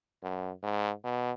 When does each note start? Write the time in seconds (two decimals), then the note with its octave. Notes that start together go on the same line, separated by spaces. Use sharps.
0.23 F#2
0.63 G#2
1.04 B2